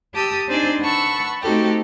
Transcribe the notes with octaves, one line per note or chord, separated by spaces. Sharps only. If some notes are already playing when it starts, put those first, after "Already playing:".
G4 A5 D#6 E6
C4 D4 D#4 C5 D5 G#5
B4 F#5 A5 C#6 E6
A3 C4 D#4 F#4 G4 A4